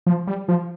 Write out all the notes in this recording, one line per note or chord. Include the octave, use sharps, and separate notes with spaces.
F3
G3
F3